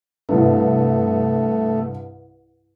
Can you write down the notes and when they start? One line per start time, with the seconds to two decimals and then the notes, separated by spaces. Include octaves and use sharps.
0.29 C2 G2 A3